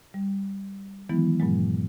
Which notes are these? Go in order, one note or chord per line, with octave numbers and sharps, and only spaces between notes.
G3
D#3 E3 F#3 G#3 B3 E4
G2 A#2 F#3 G#3